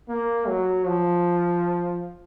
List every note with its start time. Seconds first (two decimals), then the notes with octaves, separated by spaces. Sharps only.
0.09 A#3
0.47 F#3
0.87 F3